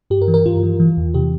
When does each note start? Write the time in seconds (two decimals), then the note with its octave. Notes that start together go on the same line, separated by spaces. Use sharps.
0.10 G2 G4
0.22 A#4
0.28 E3
0.34 A#4
0.46 G2 F4
0.63 E3
0.80 E3
0.97 E2
1.14 C3 G4